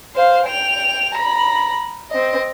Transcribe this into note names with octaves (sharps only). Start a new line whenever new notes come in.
C5 F5
G5 F7
A#5 B5
C4 D#5